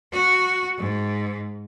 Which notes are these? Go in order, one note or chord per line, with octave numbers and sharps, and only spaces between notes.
F#4
G#2